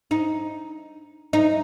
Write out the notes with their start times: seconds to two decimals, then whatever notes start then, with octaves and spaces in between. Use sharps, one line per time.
0.11 D#4
1.33 D#4